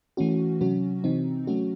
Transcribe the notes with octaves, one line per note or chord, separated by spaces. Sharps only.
E3 A3 C#4 F#4
C3 F#3 C#4 F#4
C3 E3 C4 D#4
F#3 A3 C#4 F#4